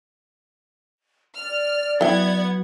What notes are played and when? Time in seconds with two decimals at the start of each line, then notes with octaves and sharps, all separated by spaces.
1.37 D5 F6
2.01 F#3 B3 E4 F#5 G5 G#6